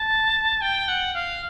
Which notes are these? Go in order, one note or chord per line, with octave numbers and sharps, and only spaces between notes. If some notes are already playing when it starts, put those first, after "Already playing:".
Already playing: A5
G5
F#5
F5